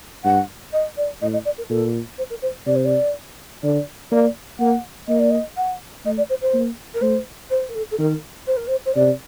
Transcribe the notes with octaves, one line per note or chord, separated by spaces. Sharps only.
G2 F#5
D#5
D5
A2 D#5
D#5
D5
A#4
A#2 A4
C5
A#4
C5
C3 D5
C5
D5
D3 D5
A#3 D5
A#3 F#5
A#3 D#5
D5
D#5
F#5
A3 D#5
D5
C5
C5
A#3
A#4
A3 C5
C5
A#4
A4
A4
D#3 A#4
C5
A#4
C5
C5
C3 D5